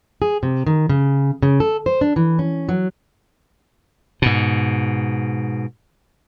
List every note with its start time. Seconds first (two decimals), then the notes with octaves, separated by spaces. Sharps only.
0.22 G#4
0.43 C3
0.66 D#3
0.89 C#3
1.42 C#3
1.60 A4
1.86 C5
2.01 D4
2.16 E3
2.39 C#4
2.69 F#3
4.22 G#2 B2